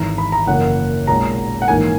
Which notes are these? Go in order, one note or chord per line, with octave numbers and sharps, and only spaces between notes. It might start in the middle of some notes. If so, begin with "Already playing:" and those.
Already playing: G#1 G#2 E3 A#5
B5
A#5
F#1 F#2 E3 A#3 F#5
B1 A#2 G#3 A#5
F#5
A#1 G#2 E3 A#3 D#4 G#5